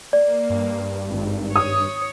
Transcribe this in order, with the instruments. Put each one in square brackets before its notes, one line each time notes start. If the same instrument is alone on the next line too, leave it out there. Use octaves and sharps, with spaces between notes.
[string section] A#3 [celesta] D5
[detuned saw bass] G2
[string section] G#1
[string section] C#5 [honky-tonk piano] D#6